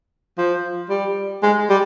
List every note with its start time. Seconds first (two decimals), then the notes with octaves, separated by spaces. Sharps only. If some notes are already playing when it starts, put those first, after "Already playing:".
0.38 F3
0.90 G3
1.43 G#3
1.70 G3